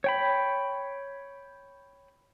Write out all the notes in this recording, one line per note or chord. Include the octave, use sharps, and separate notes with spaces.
C#5 G5 B5